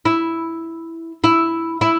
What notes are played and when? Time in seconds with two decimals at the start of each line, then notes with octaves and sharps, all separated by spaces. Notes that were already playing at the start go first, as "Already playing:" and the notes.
0.05 E4
1.24 E4
1.81 E4